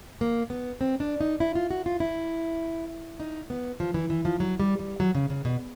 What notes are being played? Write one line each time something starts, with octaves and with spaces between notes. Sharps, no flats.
A#3
B3
C4
D4
D#4
E4
F4
F#4
F4
E4
D#4
B3
F3
E3
E3
F3
F#3
G3
G3
F#3
C#3
C#3
B2